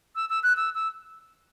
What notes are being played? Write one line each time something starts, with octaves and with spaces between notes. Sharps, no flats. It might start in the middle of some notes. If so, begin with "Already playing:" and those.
E6
E6
F#6
E6
E6